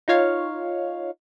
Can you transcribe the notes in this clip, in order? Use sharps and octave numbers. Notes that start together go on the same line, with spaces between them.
D#4 F4 C#5 F5